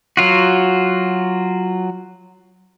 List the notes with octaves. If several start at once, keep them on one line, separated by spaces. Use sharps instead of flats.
F#3 F4 F#4